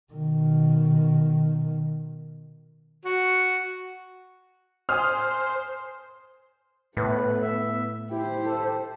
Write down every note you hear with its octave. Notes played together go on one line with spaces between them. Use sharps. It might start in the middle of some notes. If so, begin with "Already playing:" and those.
B2 D#3
F#4
C5 G#5 D#6 F6
A2 B3 B4
E5
E4 G4 C5
A4